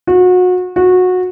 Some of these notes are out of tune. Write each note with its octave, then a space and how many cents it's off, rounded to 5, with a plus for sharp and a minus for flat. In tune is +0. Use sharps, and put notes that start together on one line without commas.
F#4 -30
F#4 -20